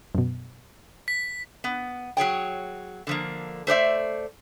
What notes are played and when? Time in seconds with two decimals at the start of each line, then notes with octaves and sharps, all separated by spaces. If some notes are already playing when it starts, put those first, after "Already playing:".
0.15 F#2 B2
1.08 B6
1.64 B3
2.17 F#3 G#4 C#5 G5
3.07 D3 F3 A#3
3.67 A3 C5 D5 E5